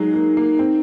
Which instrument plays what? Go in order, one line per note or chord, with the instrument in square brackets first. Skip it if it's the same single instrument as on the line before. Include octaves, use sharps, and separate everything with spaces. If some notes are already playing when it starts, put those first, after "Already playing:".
Already playing: [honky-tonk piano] F#3 G#3 [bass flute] D#4
[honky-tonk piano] A#3
A#3
C4